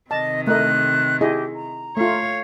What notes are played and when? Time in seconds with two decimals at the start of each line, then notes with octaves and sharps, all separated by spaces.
0.11 C3 D#3 D#5 A5
0.47 A3 A#4 D#5 F#6
1.21 E4 G4 G#4 D#5
1.55 A#5
1.97 A3 F4 C#5 F5